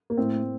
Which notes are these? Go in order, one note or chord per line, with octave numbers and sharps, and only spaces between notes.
A#3
A2 C4
A2